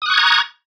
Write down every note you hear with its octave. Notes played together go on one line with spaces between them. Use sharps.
A#5 C#6 D#6 F#6 G#6